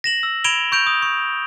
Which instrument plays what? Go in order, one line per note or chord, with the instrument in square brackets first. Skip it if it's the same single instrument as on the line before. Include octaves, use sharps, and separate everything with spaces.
[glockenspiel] A#6 E7 F#7
E6
B5 G#6 D7 E7 F7 G7
C#6 G6 D7 F7
D#6
C#6